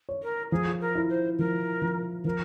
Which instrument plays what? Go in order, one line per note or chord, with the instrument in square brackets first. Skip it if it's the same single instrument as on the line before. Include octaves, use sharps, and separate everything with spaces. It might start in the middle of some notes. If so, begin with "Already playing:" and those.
[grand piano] C#5
[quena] A#4
[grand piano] F3 [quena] G#4
[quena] A#4
[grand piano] E4
[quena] C5
[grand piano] F3 [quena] A#4
[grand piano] F3
[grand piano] F3 [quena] A#4